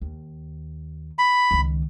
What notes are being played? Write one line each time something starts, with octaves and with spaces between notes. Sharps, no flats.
D#2
B5
C#2 D#3